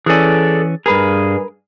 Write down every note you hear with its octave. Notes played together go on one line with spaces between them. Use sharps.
E3 C#4 G#4 A4 D5
G2 G#4 A#4 B4